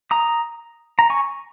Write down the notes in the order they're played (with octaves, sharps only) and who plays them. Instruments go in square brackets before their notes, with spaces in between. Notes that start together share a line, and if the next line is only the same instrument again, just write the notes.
[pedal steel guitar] A#5 D#6
A#5
G#5 C#6